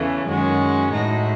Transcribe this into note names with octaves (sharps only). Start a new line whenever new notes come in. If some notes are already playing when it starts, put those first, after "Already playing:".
Already playing: E2 C#3 E3 A3 C#4
F#2 D#3 G#3 C#4 F#4
A2 G#3 D#4 F#4